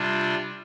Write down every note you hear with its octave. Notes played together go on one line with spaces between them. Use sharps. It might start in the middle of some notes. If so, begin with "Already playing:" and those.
Already playing: C3 G3 D4 F4